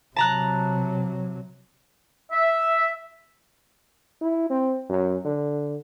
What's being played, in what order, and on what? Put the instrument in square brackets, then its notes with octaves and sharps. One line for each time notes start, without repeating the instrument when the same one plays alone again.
[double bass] C3 F#3 [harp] A5 A#5 F#6
[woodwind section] E5
[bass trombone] E4
C4
F#2
D3